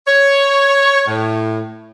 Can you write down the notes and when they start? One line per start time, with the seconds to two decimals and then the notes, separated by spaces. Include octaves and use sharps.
0.07 C#5
1.07 A2